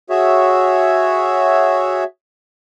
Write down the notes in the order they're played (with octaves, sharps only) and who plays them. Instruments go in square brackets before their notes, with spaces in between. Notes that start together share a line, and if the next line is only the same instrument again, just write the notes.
[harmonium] F#4 G#4 C#5 E5